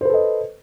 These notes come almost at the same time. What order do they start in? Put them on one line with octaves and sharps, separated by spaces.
C5 B4 A4 D#5